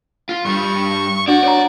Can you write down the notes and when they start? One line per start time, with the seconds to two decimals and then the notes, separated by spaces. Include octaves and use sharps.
0.29 F4
0.45 G2 G3 C#6
1.28 D4 F#4 D5
1.44 C#5 D5 A#5